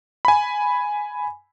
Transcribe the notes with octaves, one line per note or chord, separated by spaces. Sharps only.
G#5 B5